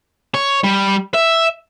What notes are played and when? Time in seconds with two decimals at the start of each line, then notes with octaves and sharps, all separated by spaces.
0.34 C#5
0.64 G3
1.14 E5